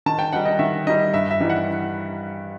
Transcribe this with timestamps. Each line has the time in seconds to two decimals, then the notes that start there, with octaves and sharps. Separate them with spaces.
0.06 D#3 A5
0.19 G5
0.33 G3 D#4 F#5
0.45 D#5
0.59 D#3 E5
0.87 G3 D#4 D#5
1.13 G2 E5
1.31 E5
1.40 E3 G3 D#4
1.50 F#5